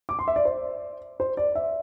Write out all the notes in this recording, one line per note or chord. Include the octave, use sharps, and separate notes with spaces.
D6
C6
E5
D5
C5
C5
D5
E5